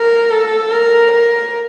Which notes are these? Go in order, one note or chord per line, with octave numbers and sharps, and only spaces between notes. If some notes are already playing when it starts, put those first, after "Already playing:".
Already playing: A#4
A4
A#4
A#4